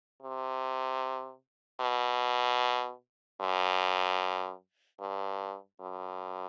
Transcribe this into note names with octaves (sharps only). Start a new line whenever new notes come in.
C3
B2
F#2
G2
F#2